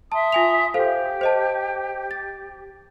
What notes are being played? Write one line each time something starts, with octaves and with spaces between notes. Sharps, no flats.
E5 A5 C6 D#6
F4 G#5 F7
G4 A4 C5 F5
C5 D#5 A5
A6